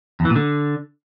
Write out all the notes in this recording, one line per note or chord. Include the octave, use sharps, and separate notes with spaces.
E2
E3
A#2
D3